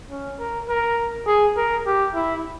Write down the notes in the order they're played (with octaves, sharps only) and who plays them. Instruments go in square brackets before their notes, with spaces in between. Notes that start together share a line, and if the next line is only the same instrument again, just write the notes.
[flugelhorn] C#4
A#4
A#4
G#4
A#4
G4
E4